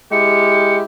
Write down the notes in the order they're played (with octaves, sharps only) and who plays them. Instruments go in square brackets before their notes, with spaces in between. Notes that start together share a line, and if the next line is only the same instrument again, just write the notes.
[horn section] G#3 E4 G4 [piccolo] C#7